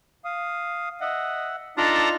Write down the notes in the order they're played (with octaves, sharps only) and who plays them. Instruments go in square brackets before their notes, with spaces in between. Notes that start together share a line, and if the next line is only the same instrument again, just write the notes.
[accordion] F5 D#6
[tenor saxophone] D#5 [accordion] E5 F#5
[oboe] D4 [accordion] D#4 [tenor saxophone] F4 [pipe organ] A4 A#5